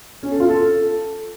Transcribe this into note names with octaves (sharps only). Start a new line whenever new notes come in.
C#4
A4
F4
A4